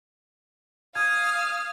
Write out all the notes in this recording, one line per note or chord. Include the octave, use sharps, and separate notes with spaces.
F5 D#6 F6 G#6